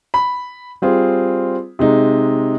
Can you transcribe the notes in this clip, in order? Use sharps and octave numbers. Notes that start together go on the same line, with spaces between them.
B5
G3 C4 F4 G#4
C3 G#3 D#4